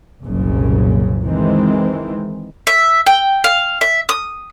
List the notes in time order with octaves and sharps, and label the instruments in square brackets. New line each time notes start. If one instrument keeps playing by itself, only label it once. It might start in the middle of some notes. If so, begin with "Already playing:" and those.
[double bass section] F#1 C2 A#2 C#3
D#3 E3 G#3 C4
[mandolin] E5
G5
F5
E5
D#6